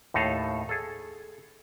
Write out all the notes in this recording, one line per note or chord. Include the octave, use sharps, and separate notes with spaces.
D#2 A2 D#4 A4 F5
G#4 A4